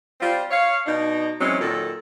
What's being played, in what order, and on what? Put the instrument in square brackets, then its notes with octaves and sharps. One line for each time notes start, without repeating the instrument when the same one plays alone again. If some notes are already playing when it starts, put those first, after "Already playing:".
[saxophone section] G3 C4 F4
C#5 F5
B2 D4 D#4
E3 F#3 G#3 C4 C#4
A#2 D#3 F#3 A4